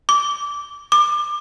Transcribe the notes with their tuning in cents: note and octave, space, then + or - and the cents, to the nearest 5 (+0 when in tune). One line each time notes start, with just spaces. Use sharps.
D6 -20
D6 +25